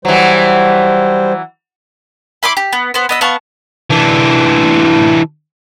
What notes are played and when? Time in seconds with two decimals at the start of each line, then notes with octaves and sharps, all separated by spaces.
0.05 E3 F#3 G3 C5
2.43 E4 B5 C6 D6
2.57 G4
2.73 B3
2.94 B3 C5
3.09 B3 D#5 E6
3.21 B3 F5 A5 C#6
3.90 E3 D4